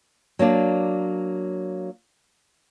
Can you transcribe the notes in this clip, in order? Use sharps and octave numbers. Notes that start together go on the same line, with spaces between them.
F#3 A#3 D4 D5